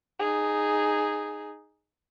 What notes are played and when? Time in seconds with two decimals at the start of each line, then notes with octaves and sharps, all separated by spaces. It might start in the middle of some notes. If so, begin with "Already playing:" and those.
0.19 D#4 G#4